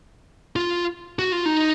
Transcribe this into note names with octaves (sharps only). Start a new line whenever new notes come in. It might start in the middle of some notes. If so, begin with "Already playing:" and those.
F4
F#4
F4
D#4